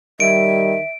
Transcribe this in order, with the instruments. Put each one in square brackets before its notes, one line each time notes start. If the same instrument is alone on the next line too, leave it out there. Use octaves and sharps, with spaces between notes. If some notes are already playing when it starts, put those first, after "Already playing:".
[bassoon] D#3 [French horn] G3 [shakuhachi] E5 [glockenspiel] D7